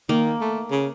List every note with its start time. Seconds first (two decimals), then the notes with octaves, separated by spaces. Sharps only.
0.09 D#3 A#3
0.41 A3
0.71 C#3